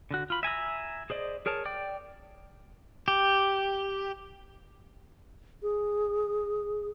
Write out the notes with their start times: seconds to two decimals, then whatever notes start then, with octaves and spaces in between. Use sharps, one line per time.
0.11 D3 F#4
0.30 F4 B5
0.43 E5 G#5 A#5 E6
1.10 G#4 C5 D5 D#5
1.46 G#4 A#4 C#5 A5
1.65 D5 G5 D6
3.08 G4
5.62 G#4